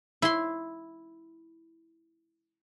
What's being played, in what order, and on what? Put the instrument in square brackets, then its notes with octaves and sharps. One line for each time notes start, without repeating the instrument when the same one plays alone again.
[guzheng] E4 C6